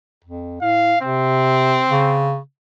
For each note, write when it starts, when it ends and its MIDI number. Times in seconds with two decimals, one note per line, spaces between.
0.24 0.60 41
0.61 0.94 45
0.61 0.99 77
1.02 1.83 48
1.02 2.37 60
1.90 2.39 49